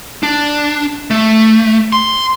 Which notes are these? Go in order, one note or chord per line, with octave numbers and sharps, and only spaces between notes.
D4
A3
C6